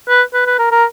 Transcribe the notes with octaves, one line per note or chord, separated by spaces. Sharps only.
B4
B4
B4
A#4
A#4